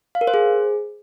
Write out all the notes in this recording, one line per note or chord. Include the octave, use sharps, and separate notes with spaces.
F5
A#4
C5
G#4